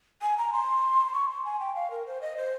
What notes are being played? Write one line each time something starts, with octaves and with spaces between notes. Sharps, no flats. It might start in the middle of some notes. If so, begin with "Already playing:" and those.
G#5
A#5
C6
C#6
C6
G#5
G5
F5
A#4
C5
D#5
C5